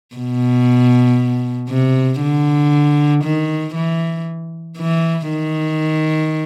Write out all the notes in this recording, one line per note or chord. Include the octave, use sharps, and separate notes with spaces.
B2
C3
D3
D#3
E3
E3
D#3